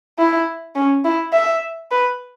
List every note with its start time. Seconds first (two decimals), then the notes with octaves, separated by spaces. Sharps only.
0.19 E4
0.75 C#4
1.04 E4
1.33 E5
1.91 B4